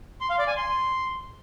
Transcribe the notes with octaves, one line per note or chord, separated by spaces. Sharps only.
C6
F5
D5
G#5
C6